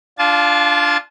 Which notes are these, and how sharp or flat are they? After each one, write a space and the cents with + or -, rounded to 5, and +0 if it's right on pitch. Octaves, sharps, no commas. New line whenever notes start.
D4 +0 F4 +0 A5 -35